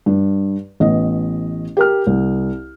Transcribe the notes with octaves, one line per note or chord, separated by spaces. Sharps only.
G2
A1 B3 D#5
G4 A#4 F6
C2